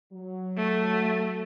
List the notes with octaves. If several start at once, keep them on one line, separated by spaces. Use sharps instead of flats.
F#3
A3